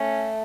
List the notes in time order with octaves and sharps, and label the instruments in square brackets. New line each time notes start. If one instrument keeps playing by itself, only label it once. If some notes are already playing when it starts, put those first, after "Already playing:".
Already playing: [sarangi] A3 [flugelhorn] C#4